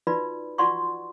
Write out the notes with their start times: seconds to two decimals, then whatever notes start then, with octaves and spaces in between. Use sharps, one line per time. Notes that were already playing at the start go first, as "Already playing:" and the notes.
0.07 D#4 F4 F#4 B4 D5 B5
0.58 F4 F#4 D5 F#5 C6 C#6